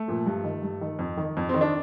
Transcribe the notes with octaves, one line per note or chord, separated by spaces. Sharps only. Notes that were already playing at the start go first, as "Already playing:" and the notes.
Already playing: A3
A#2 F3
G2
D#3
G2
D#3
F2
D#3
F2
C4
D#3
D4